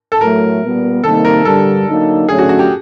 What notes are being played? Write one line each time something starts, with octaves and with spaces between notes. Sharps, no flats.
A4
A2 F#3 A3 A#4
A#2 G3 B3
C3 D#3 G3 A#3 D#4 A4
A#4
G2 D3 G3 A4
D3 F#3 A#3 D#4
D3 F#3 A3 C#4 G#4
F#4
F#4
G4